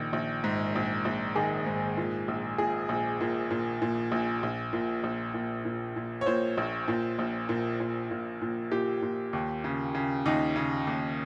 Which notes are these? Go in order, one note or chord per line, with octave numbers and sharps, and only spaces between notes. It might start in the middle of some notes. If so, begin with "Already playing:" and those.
Already playing: A#1 D#3
A#1
G#2
A#1
A#1
D#3 G#4
G#2
A#2
A#1
A#2 G#4
A#1
A#2
A#2
A#2
A#1
A#1
A#2
A#1
A#2
A#2
A#2
C#5
A#2 C5
A#1
A#2
A#1
A#2
A#2
A#2
A#2
A#2 G4
A#2
D#2
C#3
C#3
D#2 D#4
C#3
D#2